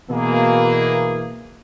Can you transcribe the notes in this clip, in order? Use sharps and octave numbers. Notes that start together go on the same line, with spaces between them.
B2 E3 A#3 G#4